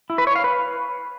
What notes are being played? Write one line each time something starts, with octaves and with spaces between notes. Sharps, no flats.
E4
B4
C#5
F5
B4